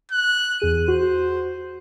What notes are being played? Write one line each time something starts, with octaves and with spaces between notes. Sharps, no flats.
F#6
E2 G#4 D#7
F#4 C5